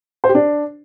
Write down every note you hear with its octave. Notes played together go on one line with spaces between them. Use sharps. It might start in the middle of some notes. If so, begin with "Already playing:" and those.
C5
G4
D4